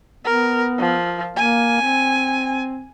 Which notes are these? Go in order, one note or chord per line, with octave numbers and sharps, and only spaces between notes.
B3 A#4
F3
A#3 G#5
C4